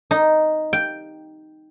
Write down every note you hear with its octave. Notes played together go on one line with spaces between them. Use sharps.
D#4
G5